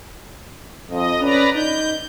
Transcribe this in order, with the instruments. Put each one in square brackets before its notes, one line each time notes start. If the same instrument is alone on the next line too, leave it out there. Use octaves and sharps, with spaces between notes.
[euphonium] F2 [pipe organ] D#5
[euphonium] C#4 [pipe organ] B4 D5 A#5
[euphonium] D#4 [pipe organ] G6